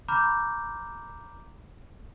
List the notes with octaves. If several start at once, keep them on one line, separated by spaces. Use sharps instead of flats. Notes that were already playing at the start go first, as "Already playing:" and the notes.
A#5 B5 D6 F6 G6